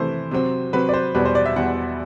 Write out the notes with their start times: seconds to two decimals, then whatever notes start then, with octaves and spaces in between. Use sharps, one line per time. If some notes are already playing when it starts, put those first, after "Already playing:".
Already playing: C3 E3 A3 C5
0.31 C3 F#3 C4
0.73 C3 F#3 C4 B4
0.89 D5
0.94 C5
1.15 E2 B2 G3 B4
1.25 C5
1.35 D5
1.46 E5
1.56 E2 B2 G3 F#5